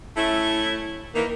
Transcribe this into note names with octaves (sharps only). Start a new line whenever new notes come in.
A3 C#4 E4
D#3 E3 A#3